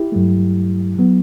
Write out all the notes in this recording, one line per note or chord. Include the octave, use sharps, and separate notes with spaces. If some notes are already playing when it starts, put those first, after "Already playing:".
Already playing: E4 G4
G2 F#3 A3
F#3 B3